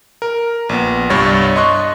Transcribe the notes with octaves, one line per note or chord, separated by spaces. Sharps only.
A#4
A#1 B3
C2 G2 C#5 C#6 A6
D#5 C6 C#6 F#6